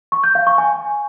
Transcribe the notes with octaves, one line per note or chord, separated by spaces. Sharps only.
C#6
G6
F5
C#6
G#5